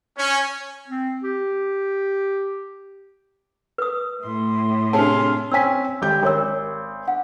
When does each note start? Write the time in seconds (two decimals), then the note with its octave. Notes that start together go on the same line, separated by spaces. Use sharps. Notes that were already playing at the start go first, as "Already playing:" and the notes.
0.17 C#4
0.88 C4
1.23 G4
3.78 B4 D#6
4.23 A2 C6
4.93 C3 C#4 D4 G#4 F5 A5 C6
5.52 C4 C#4 G#5 E6 B6
6.02 G#1 G4 G6
6.23 G#1 A#4 C#5 E6
7.08 F#5